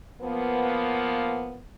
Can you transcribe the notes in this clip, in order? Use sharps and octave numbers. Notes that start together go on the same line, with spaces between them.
F3 A#3 B3